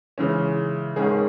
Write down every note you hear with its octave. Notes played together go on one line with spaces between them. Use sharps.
C#3 E3 G#3 C#4
G#2 D#3 G#3 C#4 G#4